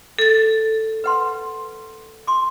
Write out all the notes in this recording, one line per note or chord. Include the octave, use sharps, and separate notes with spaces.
A4 A6
B4 F#5 C6
C6 D6